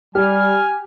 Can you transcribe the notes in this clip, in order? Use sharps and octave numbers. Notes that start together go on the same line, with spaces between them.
G3 G4 G#5 F6